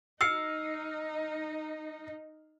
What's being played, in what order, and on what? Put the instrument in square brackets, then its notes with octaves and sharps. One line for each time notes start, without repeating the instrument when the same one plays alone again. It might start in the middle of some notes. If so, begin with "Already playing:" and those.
[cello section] D#4 [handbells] E6 [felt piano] F6 C7 C#7